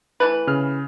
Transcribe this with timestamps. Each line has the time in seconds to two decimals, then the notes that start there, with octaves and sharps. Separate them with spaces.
0.20 E3 A3 B4
0.47 C#3 F6